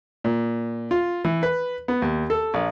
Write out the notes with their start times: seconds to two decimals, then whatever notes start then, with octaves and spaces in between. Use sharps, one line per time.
0.24 A#2
0.91 F4
1.25 E3
1.43 B4
1.88 B3
2.02 D#2
2.30 A4
2.54 A#1